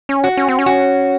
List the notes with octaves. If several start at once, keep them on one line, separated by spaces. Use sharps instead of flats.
C#4
F#4
C#4
C4
C#4
F#4